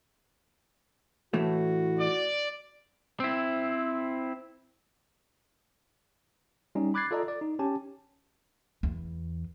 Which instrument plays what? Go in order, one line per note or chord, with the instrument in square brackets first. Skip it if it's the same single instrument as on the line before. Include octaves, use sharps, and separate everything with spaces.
[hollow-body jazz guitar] A2 E3 A3 [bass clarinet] F#4
[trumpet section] D5
[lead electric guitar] C4 E4
[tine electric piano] G3 C#4 D#4
B5 D6 F#6 G#6 A6 C7
F4 A4 D5 D#5 A#5
D5
D#4
C#4 G4 G#5 A5
[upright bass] E2